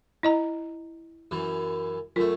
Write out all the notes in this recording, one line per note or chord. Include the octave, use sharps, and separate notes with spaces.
E4 D#5 A#5
F#2 E3
F#2 A3 F4